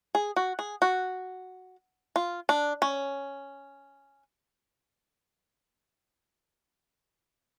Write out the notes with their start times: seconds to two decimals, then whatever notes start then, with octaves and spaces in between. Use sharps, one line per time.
0.15 G#4
0.36 F#4
0.59 G#4
0.82 F#4
2.16 F4
2.49 D4
2.82 C#4